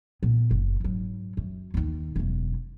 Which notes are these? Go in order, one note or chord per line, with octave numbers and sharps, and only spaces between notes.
A#2 B3
F#1
G#2 F#3
F#2
D#2 D#3
E1 F#2